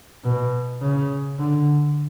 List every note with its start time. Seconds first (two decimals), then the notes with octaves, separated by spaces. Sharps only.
0.24 B2
0.81 C#3
1.39 D3